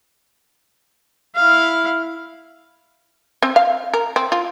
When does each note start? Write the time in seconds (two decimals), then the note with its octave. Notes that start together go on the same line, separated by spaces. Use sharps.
1.36 E4 F5
3.42 C4
3.56 F5
3.94 A#4
4.16 C4
4.32 F4